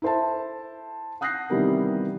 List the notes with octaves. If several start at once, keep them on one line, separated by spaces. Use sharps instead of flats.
E4 A4 C5 E5 A5
F#5 D#6 F#6 G6 A#6 C7
C3 D#3 E3 G3 B3 A#4